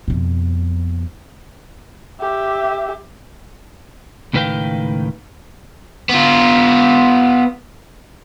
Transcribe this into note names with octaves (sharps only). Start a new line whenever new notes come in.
F2 B2
G4 E5
C#2 A2 D#3 B4 F5 G5
B3 F4